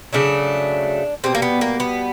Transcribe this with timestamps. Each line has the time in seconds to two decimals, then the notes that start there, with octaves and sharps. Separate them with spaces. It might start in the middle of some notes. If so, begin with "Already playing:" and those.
0.13 C#3 F#3 A3 D4
1.24 B2 G3 C4
1.35 A#3
1.42 B3
1.61 A#3
1.80 B3